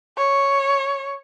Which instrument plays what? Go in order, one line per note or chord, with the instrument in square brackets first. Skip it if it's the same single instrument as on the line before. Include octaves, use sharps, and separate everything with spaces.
[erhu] C#5